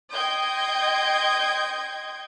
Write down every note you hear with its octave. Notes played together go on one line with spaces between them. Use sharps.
D#5 G5 C6 G6 G#6